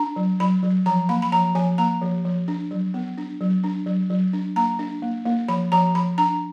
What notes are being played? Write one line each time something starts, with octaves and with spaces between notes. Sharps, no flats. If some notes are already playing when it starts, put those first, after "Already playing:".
Already playing: D4 A#5
F#3
F#3 B5
F#3
F3 A#5
A#3 B5
B5
F3 A#5
F3 G#5
A#3 A#5
F3
F3
D4
F#3
B3
D4
F#3
D4
F#3
F#3
D4
A#3 A#5
D4
A#3
A#3
F3 B5
F3 A#5
F3 B5
D4 A#5